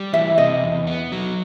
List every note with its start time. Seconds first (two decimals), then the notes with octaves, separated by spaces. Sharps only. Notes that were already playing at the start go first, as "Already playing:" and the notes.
Already playing: G3
0.13 E3 E5
0.38 C3 D#5
0.63 E2
0.87 B3
1.12 F#3